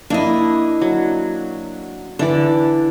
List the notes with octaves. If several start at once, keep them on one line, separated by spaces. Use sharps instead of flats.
A#3 D4 E4 D#5
F#3
D3 E3 A4 D5